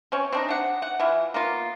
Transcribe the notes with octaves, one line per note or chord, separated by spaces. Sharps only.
C4 C#4
C4 D4 D#4
D4 F#5
F#5
E3 E4 F4
A#3 B3 F4